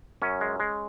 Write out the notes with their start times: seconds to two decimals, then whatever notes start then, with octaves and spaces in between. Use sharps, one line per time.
0.22 F#2 C#4
0.41 G#3
0.60 G#3